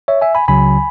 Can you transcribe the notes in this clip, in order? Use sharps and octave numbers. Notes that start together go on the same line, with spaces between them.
C#5 E5
E5 G#5
G#5 B5
C#2 C#3 F#3 G#5 B5